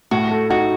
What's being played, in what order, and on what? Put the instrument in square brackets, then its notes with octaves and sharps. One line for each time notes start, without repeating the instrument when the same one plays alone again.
[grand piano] A2 [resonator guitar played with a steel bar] F#4
[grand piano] A3
[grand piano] D#4 [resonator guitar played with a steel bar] F#4